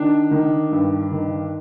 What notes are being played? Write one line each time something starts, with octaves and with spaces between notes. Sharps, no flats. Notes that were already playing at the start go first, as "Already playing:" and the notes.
Already playing: D#3 D4
D#3
G2
D#3